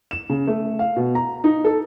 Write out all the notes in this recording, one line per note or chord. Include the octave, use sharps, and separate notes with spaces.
E7
C#3
A3
F5
B2
A#5
D#4
A4